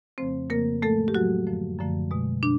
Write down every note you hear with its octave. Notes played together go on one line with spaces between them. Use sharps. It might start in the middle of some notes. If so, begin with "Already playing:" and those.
F2 C#3 F3 A3 C4 C5
F2 C#3 F3 A3 A#3 A#4
A2 F3 G#3 A3 A4
G4
A2 F3 F#3 G#3 F#4
F#2 D3 F3 A3
F#2 D3 F3 A3
B2 G#3
B2 D4